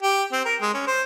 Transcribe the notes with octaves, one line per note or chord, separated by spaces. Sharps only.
G4
C4
A#4
G#3
C#4
C5